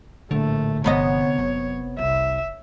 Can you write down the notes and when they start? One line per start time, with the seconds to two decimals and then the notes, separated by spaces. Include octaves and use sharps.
0.31 A#1 A2 D3 A3
0.84 G1 C3 F3 B3 C#5 D#5
1.38 F#1 F#3
1.98 C2 E5